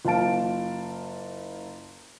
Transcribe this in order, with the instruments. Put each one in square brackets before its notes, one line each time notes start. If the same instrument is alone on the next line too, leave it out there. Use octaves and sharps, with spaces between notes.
[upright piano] F#1 F4 F5 A5 D7